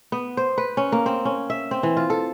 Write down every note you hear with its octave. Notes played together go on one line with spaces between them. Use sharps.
B3
C5
B4
C#4
A#3
C4
C#4
E5
C4
E3
F4
A4